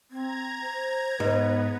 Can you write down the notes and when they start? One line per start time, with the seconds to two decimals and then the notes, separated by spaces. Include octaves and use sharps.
0.11 C4 A#5 G#6
0.61 C5
1.20 G#2 B3 B4